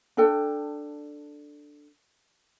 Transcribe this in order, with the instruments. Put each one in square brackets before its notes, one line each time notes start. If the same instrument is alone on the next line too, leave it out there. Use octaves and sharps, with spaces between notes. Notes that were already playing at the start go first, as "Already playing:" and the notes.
[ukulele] D4 A4 G5